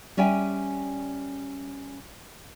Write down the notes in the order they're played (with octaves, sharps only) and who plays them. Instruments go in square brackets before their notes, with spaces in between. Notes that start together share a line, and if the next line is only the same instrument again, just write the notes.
[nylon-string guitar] G3 C#4 D5 E5 G5 G#5